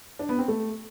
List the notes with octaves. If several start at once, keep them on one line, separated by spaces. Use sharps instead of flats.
D4
B3
C4
A3